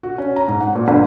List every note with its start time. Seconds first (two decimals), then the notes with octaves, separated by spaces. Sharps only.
0.03 F#4
0.18 C#4
0.36 A#5
0.48 G#2
0.60 F#5
0.75 A#2
0.88 G1